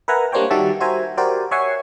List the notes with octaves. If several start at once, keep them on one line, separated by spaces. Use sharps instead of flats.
A#4 B4 E5 F#5 G#5 A#5
G3 A#3 D4 C5 C#5 G5
D#3 G3 F#4 G4 E5 A5
F#4 C5 E5 G#5 A#5
F#4 G4 A#4 C5 D5
C#5 E5 F#5 G#5 C#6 C7